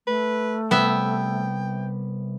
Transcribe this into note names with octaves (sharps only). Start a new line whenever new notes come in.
A3 B4
C3 G3 B3 E5 G5